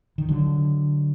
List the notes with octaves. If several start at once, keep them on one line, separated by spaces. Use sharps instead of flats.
D#3
D3 F#3